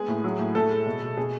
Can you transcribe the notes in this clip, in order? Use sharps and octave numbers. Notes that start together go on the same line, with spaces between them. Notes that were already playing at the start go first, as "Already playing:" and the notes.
Already playing: G#3 B3 G#4
A2
F#3
A2
A2 A4
G#3
B2
B2
B2 G#4